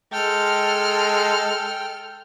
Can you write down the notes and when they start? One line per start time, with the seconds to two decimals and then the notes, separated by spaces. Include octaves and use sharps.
0.12 G#3 A4 G5 F6